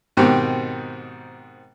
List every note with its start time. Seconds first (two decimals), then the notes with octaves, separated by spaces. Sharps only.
0.17 G#2 B2 D#3 C4 G4